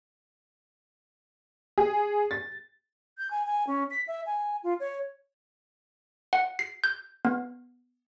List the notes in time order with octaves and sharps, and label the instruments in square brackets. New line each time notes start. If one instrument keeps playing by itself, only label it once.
[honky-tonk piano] G#4
A6
[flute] G6
G#5
G#5
C#4
B6
E5
G#5
F4
C#5
[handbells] F#5
C7
G6
B3